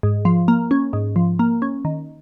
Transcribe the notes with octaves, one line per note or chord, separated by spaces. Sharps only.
G#2
F3
A#3
C#4
G#2
F3
A#3
C#4
D#3